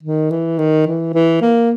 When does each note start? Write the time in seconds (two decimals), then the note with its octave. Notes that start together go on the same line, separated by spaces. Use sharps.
0.03 D#3
0.31 E3
0.59 D#3
0.87 E3
1.14 E3
1.41 A#3